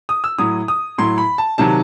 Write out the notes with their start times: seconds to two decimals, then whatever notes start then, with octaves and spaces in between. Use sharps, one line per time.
0.09 D#6
0.24 E6
0.38 A2 F#3 D#6
0.68 D#6
0.98 A2 F#3 C6
1.18 B5
1.38 A5
1.58 C3 D#3 F#3 A5